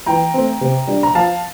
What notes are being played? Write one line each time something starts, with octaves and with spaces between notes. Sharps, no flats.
E3 G5 A#5
A3 C4
C3
G3 D4
A#5
F3 F5 A5